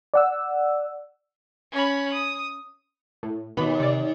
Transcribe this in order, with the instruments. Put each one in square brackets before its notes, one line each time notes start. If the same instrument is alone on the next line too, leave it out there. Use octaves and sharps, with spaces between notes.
[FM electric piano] D5 F#5 E6
[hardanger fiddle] C#4 B5
D#6
[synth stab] A2
[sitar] D#2 [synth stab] B2 B3 B5
[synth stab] C3 D5